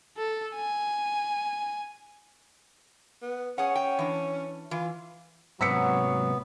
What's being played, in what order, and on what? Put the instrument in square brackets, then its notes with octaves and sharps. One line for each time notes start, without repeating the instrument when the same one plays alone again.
[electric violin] A4
G#5
[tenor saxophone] B3
[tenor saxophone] C#4 [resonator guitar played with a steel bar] G#4 F#5
[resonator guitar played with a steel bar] G5
E3 D4
[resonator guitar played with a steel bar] E3 [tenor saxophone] F4
[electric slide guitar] G#2 C3 [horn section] F#3 [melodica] B3 [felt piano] E6 B6 C#7